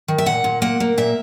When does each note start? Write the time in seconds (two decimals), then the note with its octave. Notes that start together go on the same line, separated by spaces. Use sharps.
0.08 D#3
0.18 E5
0.26 A#2 F#5
0.44 A#2
0.62 A#3 F#5
0.80 A#3
0.98 A#2 E5